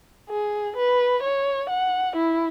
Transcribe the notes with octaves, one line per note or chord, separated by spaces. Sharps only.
G#4
B4
C#5
F#5
E4